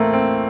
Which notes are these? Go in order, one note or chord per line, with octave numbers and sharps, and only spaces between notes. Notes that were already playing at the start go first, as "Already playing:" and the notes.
Already playing: A2 E3 A3 A#3 C4
C4